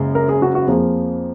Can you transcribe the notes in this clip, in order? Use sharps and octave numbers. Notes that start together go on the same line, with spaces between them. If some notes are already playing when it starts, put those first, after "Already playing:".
Already playing: F#1 F#2 C#3 G#3
A#4
G#4
F#4
F#4
F2 F3 A#3 G#4